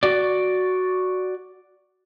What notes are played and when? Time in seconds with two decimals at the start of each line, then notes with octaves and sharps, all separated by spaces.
0.03 F#4 D5